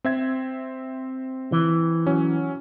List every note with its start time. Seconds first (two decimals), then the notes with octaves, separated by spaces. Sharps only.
0.04 C4 E5 G#6
1.52 E3
2.06 F#3 C#4